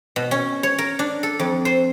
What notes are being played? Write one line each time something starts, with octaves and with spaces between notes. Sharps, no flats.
B2
C#4
C#5
A#4
D4
A4
F2
C5